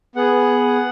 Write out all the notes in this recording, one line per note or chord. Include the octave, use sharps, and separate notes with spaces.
B3 G#4 F#5